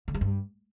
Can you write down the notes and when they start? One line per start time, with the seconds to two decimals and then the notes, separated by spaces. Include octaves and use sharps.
0.08 D3
0.14 G#3
0.21 G2